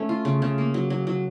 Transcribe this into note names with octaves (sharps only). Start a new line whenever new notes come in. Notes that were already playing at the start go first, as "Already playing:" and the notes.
Already playing: A3 C#4
F4
C#3
C#3
A#3
F#3
F#3
F#3